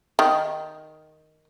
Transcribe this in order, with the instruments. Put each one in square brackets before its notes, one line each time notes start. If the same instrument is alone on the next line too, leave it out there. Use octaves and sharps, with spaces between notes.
[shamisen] D#3